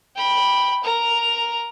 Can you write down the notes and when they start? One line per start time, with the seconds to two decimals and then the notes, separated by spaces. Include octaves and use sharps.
0.16 G5 B5
0.84 A#4 A#5